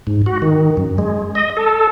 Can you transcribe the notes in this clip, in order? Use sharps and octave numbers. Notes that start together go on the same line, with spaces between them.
G#2
F#4
D#3
F#2
G#3
D#5
A4